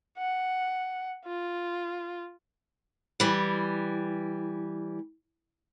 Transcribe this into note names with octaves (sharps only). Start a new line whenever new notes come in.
F#5
F4
E3 G3